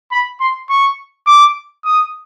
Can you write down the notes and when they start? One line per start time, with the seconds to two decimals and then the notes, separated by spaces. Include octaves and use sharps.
0.12 B5
0.40 C6
0.69 C#6
1.27 D6
1.85 D#6